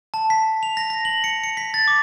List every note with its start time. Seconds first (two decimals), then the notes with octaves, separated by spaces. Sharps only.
0.14 A5
0.30 B6
0.63 F7
0.77 A#6
0.90 A#6
1.05 F#7
1.24 C#7
1.44 C#7
1.57 B6
1.74 A6
1.88 D6